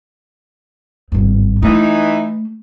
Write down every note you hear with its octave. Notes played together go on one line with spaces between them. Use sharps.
G#1 G2
E3 A3 D#4